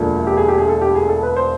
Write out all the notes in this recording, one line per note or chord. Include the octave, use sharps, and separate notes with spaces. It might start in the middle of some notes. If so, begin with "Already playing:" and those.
Already playing: E1 D2 D3 F3 A#3
G4
G#4
G4
G#4
A4
G4
G#4
A4
B4
C5